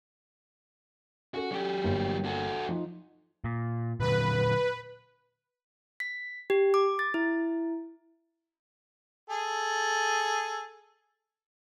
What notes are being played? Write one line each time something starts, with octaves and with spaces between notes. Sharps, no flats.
C#4 F#4 A4
F#3 G4
G1 A#3 G5
F#4 A4
F3 D#4
A#2
A#2 D3 F#3 B4
B6
G4
D6
A6
E4
G#4 A4